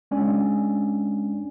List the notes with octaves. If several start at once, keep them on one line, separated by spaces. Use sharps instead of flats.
G#3 C#4 D4 D5 G#5